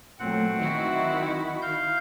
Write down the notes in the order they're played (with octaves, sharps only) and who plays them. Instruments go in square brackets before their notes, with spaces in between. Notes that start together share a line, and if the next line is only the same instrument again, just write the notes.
[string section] A#2 F#3 A3 [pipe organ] C4 F#5
[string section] D#3 E4 F#4
[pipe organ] F5 G6